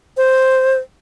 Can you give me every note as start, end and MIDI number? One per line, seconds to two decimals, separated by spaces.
0.17 0.78 72